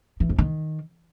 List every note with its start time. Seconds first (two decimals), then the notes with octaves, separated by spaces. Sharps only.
0.20 E3
0.29 F2
0.38 D#3